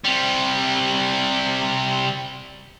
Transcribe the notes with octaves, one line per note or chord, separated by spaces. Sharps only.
C3 G3